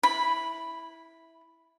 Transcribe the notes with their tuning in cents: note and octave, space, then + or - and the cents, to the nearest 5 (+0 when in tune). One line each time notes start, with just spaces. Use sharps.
E4 -5 B5 +0